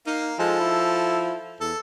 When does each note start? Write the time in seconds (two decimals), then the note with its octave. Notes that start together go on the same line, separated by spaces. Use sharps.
0.07 A#3 D#4 F5
0.39 F3 G#3 A4
0.60 E4
1.61 E2 A4